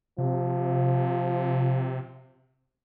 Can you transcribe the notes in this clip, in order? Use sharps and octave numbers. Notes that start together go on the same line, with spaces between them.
C3 F3